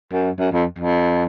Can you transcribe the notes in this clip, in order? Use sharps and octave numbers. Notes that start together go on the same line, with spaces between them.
F#2
F#2
F2
F2